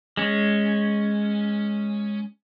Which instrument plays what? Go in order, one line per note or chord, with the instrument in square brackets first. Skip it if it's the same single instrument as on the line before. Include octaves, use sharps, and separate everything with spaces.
[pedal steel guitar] G#3 C#4